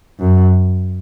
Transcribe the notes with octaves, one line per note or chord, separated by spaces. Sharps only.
F#2